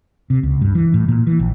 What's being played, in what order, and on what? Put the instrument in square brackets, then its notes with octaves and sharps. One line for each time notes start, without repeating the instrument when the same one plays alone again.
[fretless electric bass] C3
C#2
G2
E3
A2
A#2
E3
A#1